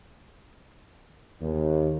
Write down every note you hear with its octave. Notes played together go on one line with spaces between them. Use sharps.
D#2